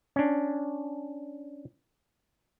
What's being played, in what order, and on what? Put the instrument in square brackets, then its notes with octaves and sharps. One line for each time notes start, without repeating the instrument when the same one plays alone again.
[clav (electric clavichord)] C#4 D4